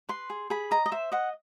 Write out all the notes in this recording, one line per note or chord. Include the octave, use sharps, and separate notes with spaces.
B4 C6
G#4
G#4 B5
D#5 A#5
D#5
C5 E5
D#5 F#5